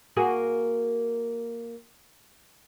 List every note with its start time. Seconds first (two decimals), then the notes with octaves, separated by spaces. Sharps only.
0.17 A#3 F#4 G#4